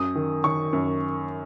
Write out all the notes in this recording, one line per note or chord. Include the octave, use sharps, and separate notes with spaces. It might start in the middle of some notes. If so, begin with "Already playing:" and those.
Already playing: F#2 D#6
D#3
D#3 C#6
F#2